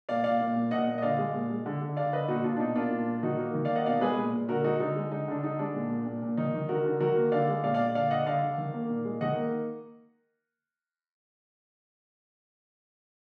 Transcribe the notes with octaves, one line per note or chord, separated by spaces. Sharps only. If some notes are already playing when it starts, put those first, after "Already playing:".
A#2 D5 F5
A#2 D5 F5
A#2
A#2
A#2 D#5 F#5
A#2
D#5
D3 D5 F5
G#3
A#2
G#3
D3
D3
D3 D5 F5
D3 B4 D#5
A#2 D#4 F#4
A#2 D4 F4
D4
B2 D#4
A#3 D4 F4
A#2
A#2
D#3 D#4 F#4
A#3
D#3
D5 F5
A#3
D#5 F#5
B2 D5 F5
G#3 G#4 B4
A#2
A#2
D3 F#4 A#4
G#3 D#4 F#4
D3 D#4
G#3
D3 D#4
D3 D4
D3 D#4
G#3 D4
A#2
A#2
A#2
A#2
D#3 D#4
D#3
D3 F#4 A#4
D3
D#3 F#4 A#4
A#3
D3 D5 F5
G#3
A#2 D5 F5
A#2 D5 F5
D3 D5 F5
D3 D#5 F#5
D3 D5 F5
D3
D#3
A#3
A#2
G#3
D#3 D#5 F#5
A#3